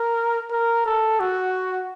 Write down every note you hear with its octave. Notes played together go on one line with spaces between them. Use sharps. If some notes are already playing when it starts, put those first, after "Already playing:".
Already playing: A#4
A#4
A4
F#4